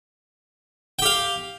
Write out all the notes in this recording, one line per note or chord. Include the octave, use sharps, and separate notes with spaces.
G4 F5 G5